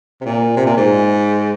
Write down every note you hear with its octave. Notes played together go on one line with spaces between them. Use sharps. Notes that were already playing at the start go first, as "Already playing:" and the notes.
C3
A#2
C3
A#2
G#2